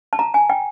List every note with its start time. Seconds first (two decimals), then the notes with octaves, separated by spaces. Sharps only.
0.13 A5
0.19 A#5
0.34 G#5
0.50 G5